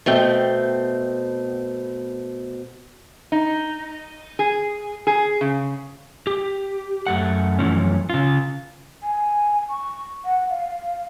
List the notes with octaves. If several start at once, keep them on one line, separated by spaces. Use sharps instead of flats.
B2 A3 C4 G5
D#4
G#4
G#4
C#3
G4
F#2 A3 F#5
F#2 B2 E3 F3 A3 C#4
C#3 F4
G#5
C#6
F#5
F5